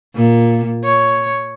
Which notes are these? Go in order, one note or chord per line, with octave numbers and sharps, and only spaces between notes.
A#2
C#5